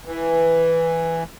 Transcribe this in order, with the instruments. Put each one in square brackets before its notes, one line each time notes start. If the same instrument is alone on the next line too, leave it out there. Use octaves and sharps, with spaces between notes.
[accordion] E3